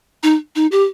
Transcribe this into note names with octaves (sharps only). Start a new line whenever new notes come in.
D#4
D#4
G4